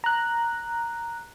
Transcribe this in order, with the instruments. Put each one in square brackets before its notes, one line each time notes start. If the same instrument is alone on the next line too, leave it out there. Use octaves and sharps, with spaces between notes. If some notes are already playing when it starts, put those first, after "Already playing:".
[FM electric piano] A#5 F#6